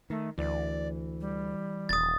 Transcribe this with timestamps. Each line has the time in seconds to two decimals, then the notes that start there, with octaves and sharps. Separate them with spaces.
0.10 D#3 A3
0.38 D2 E3 D5
1.21 G3
1.89 D#1 D#6 A6